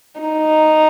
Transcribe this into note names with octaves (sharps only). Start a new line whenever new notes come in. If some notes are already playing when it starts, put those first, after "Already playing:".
D#4